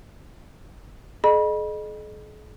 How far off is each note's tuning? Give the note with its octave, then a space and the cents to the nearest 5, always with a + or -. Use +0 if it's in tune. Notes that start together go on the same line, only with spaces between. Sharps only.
G#4 +45 D#5 -35 B5 -30